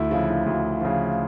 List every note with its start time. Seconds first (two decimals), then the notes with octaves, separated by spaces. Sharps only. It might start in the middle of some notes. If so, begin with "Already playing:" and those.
Already playing: D2 E4
0.11 C#3 F3 E4
0.29 E4
0.46 D2
0.81 C#3 F3